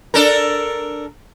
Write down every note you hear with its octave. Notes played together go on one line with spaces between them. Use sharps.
D4 A4 A#4